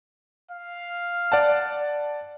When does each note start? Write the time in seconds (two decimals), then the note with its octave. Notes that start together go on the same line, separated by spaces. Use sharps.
0.51 F5
1.32 D5 F#5 A5